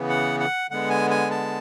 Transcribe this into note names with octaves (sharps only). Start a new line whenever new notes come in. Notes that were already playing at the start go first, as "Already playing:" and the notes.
Already playing: C#3 E3 B3
F#5
F#5
D3 G#3 B3 F#5
G#5
G#5
A5